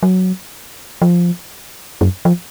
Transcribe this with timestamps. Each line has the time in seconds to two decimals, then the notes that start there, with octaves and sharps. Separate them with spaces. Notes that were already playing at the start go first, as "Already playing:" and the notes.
0.03 F#3
1.02 F3
2.01 F#2
2.25 F3